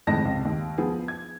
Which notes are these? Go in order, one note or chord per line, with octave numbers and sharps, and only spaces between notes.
F2 A2 D#3 G#3 A5 A#6
C#2 C3
D#2
F3 B3 G#4
G#6